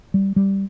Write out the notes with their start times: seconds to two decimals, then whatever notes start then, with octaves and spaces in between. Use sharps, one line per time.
0.14 G3
0.36 G3